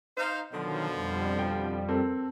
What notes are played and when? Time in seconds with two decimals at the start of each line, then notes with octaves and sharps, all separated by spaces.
0.17 D#4 C5 F5
0.53 B2 D3 D#3 F3 F#3
0.94 F2 G3
1.39 G5
1.89 C4 A4 A#4